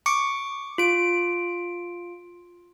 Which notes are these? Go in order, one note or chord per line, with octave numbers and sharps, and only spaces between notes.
C#6 D6 C#7
F4 D7